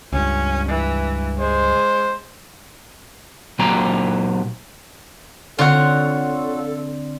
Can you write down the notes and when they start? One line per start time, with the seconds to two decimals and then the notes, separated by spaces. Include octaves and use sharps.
0.13 C#2 G2 C#4
0.69 E3
1.39 G#3 C5
3.59 A#2 F#3 A#3 G4 G5 A#5
5.59 D3 C4 F4 A4 C#5 F#5